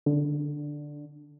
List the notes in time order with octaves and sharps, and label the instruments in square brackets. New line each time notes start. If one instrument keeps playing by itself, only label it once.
[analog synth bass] D3